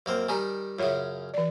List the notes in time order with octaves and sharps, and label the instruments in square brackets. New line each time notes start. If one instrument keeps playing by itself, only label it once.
[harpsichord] F#2 A#3 C4
[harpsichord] D#3 G3 [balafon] G#5 A#5
[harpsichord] F#2 C#3 [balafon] F4 C#5 E5
[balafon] E3 D5